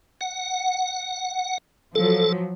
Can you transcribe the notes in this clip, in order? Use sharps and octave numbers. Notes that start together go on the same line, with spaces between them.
F#5
F3 F#3 A4